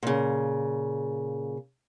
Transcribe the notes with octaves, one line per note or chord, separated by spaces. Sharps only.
A#2 C#3